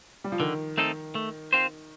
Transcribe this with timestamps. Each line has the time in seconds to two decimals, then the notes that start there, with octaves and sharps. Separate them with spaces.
0.24 G3
0.32 F3
0.40 D3 D#3
0.78 A3 C4 D#4 A4
1.15 A3
1.53 C4 F4 C5